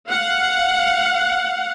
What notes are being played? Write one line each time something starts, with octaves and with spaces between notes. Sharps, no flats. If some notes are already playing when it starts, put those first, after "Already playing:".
F5 F#5